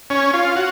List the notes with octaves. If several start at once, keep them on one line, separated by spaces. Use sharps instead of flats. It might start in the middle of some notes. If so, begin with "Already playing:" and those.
C#4
F4
F#4